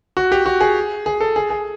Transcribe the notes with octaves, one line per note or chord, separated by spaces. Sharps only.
F#4
G4
F#4
G#4
G#4
A4
G#4
G#4